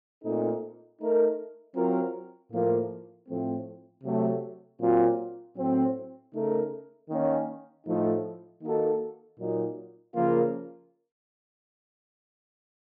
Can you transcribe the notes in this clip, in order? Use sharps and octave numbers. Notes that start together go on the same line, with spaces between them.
A#2 A3 C4 D#4 A4
A3 D#4 A#4
F#3 C4 F4 A#4
A2 F3 A#3
A2 F3 A3 C4
C3 F#3 A3
A#2 F#3 C4 F4
A2 F#3 C4
C#3 A3 D#4 A#4
D#3 A#3 C#4
A2 F3 A3 D#4
D#3 A#3 D#4 F#4 A4
A#2 F#3 A#3 D#4
C#3 F3 A#3 F4 A#4